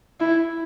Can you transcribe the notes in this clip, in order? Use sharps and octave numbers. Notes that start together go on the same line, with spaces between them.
E4